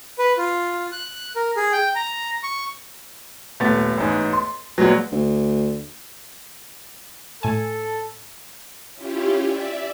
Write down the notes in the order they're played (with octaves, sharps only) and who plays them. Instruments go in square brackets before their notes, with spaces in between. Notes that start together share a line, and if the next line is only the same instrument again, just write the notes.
[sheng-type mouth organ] B4
F4
F#6
A#4
G#4
G5
A#5
C#6
[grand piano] D#1 A6 [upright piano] A3 B3
[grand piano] A1 G#2
C6
[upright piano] A#1 G#3 B3 [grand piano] F#3
[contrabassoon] D2
[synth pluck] A2 G#5 [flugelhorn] A4
[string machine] C#4 E4 F4 G4
D5 E5